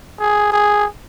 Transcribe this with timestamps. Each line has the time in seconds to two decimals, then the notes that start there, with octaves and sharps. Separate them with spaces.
0.20 G#4
0.52 G#4